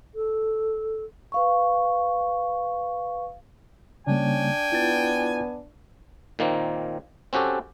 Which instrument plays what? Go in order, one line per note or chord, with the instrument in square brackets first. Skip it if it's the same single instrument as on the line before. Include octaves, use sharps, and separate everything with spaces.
[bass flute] A4
[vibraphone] B4 F5 C#6
[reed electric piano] C#3 G3 A#3 [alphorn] C#4 [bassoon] D4 [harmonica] G5 G#5
[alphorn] B3 [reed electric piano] E4 F4 A6
[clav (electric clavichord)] A#2 D#3 A#3 C4
C4 C#4 F#4 G4 A4